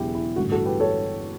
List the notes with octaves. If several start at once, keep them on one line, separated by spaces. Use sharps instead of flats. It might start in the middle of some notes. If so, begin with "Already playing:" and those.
Already playing: E1 E2 C#3 F#3 E4 G4
E4
A1 G2 D3 F#4
F#4 A4
G4 B4
A4 C#5